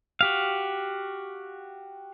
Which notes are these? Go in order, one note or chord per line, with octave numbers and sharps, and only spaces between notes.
F#4 G4 F5